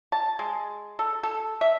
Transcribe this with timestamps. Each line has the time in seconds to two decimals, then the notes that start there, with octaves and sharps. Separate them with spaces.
0.12 A5
0.39 G#3
0.99 A4
1.23 A4
1.61 E5